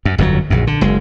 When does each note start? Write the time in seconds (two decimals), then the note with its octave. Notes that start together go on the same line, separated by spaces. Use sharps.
0.05 F#2
0.18 G1 F2 D3 F#3
0.50 A#1 F#2
0.67 D3
0.81 F#1 G#3